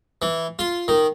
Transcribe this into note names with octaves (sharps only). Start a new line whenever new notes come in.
E3
F4
D#3